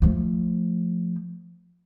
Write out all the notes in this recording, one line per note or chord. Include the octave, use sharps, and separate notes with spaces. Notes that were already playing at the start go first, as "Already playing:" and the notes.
F3 A3